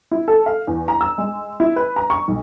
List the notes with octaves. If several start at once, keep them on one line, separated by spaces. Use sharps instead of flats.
E4
A4
F5
E2
A#5
E6
G#3
E4
B4
A#5
C#6
B1